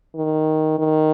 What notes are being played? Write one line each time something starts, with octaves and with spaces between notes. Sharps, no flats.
D#3
D#3